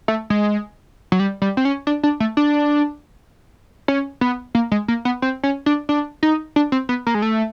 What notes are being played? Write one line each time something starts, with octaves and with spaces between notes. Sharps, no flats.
A3
G#3
F#3
G3
G3
C4
C#4
D4
D4
A3
D4
C#4
B3
A#3
G#3
A#3
B3
C4
C#4
D4
D4
D#4
D4
C4
B3
A#3
G#3
A3